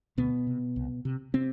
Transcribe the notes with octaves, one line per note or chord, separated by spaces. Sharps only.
D2 B2 B3
C3
C2
C3
C3 C4